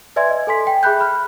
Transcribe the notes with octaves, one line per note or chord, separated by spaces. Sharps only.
B4 D5 E5 G#5 C6 G#6
D#5
A4 G#5 C6 B6
G5
G#4 E5 B5 F#6 G6
B5 F6 F#6